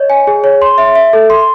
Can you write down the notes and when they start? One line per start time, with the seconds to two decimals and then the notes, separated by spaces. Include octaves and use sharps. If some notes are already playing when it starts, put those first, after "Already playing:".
Already playing: C#5 D#5
0.10 G#5
0.27 G#4
0.44 C#5
0.62 C6
0.78 E5
0.96 E5
1.13 A4
1.30 C6